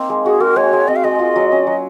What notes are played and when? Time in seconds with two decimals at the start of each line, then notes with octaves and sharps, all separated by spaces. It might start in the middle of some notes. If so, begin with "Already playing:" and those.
Already playing: A#3 C4 D#4
0.09 G#3
0.25 F#4 G#4
0.40 F#4 A#4
0.56 G#3 C#5
0.73 G#3
0.88 C4 D#5
0.96 F5
1.04 G#3 D#5
1.19 F4
1.36 F#3
1.52 C#4
1.67 F#3